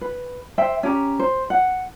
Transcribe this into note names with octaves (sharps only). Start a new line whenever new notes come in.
B4
C5 E5 G5
C#4 G4 A#5
C5
F#5